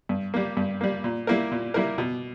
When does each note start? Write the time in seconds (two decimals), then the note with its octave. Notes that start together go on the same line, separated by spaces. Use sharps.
0.09 G2
0.34 G3 A#3
0.57 G2
0.81 G3 A#3
1.04 A#2
1.27 G3 A#3 E4 A#4
1.51 A#2
1.74 G3 A#3 E4 A#4
1.98 B2